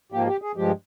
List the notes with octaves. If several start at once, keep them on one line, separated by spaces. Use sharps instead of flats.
G#2 F3 A#3 G4
G4
G#4
G2 F3 G#3 G4